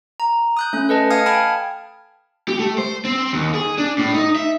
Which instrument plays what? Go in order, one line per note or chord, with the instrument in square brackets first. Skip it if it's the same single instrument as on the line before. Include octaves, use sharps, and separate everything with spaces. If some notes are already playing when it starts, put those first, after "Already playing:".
[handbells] A#5
D#6 F#6 G6
A3 C#4 F#6
A4 B4 D#5 A5
F5 G#5 D#6 F6 G#6 C#7
G5 A5 B5 F6 G#6
[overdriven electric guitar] G4
A3
C5
C4
D#2
G#4
D4
A2
D#4
E5